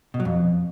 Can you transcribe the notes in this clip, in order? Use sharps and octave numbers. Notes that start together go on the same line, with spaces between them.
B2
F#3
F2